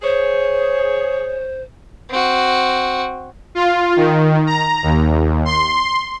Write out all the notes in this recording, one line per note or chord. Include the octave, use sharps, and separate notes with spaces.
G#4 C5 C#5
C4 F#4
F4
D#3
A#5
D#2
C6